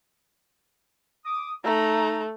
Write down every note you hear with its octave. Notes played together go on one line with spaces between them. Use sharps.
D6 D#6
A3 D#4 A#5